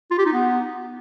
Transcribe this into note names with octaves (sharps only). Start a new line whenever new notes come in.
F4
G4
D#4
B3